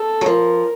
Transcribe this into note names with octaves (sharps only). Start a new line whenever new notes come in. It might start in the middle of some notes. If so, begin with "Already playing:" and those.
Already playing: A4
F#3
F3 A#4